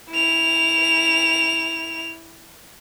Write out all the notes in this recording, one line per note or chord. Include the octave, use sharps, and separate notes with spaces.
E4 F7